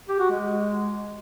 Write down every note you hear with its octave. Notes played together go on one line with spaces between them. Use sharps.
G4
F#4
G#3